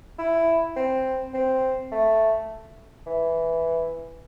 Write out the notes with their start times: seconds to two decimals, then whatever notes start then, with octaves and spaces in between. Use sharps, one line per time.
0.19 E4
0.76 C4
1.34 C4
1.92 A3
3.07 E3